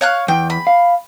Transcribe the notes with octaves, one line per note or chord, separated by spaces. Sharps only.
C#5 F5 F#6
E2 G5
B5
F5